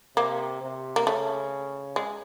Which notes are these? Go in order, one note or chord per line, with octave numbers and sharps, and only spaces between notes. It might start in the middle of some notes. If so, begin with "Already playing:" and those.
C3 A#3
C3
A#3
C#3 A3
G#3